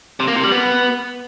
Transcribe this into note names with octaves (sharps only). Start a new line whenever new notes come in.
C3
A#3
C3
G3
B3